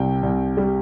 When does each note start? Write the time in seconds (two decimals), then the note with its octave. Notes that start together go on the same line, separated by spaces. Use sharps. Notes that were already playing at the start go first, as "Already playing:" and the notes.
Already playing: C2 C3 G5
0.23 C2
0.57 G3